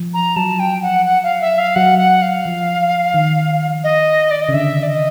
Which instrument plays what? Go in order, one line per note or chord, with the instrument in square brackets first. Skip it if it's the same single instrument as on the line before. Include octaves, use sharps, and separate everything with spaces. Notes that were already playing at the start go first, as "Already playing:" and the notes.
Already playing: [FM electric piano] F3
[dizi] A#5
[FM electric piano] F#3 [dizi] A5
[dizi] G5
F#5
F#5
F5
E5
F5
[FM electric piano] F#3 [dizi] F#5
[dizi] F#5
F5
[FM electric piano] F3
D#3
[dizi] D#5
D5
D#5
[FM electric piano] C#3
[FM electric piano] D3 [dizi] E5
[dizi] D5
D#5